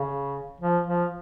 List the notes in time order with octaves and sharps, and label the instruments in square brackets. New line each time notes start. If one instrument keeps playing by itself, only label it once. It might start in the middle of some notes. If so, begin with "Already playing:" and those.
Already playing: [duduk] C#3
F3
F3